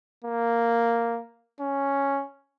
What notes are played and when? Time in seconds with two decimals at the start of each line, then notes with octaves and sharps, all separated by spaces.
0.25 A#3
1.60 C#4